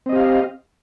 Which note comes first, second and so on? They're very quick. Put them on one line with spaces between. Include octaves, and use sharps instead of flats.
C4 D#5 G4 F5